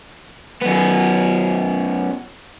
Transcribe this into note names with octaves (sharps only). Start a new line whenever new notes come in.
F#2 B3